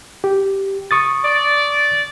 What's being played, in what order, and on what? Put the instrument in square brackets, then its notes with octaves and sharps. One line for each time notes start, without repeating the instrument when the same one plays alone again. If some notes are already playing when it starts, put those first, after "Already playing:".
[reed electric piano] G4
C#6 D#6 A6
[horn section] D5